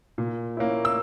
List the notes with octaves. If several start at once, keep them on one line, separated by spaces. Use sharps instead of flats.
A#2
A#3 C#4 E4
E6